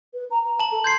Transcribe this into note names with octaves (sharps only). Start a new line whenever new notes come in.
B4
A#5
A#5
A5 F#7
A4
C6 G6 G#6 C7